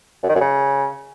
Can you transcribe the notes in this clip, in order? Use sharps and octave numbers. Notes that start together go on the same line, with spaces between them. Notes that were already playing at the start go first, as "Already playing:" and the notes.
F#2
D#3
F#2
C#3